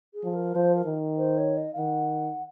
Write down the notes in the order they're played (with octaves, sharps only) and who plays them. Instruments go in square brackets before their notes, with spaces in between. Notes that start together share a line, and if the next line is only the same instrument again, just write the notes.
[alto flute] G#4
[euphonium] F3
[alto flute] A#4
[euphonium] F3 [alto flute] C5
[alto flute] A#4
[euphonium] D#3
[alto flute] C5
C#5
D#5
F5
[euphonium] D#3 [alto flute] F#5